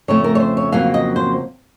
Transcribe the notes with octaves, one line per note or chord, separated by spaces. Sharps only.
F2 C#3 A3 C#5
A#4
C#5
C5
C#5
F2 C#3 F#3 A#3 F5
D#5
C5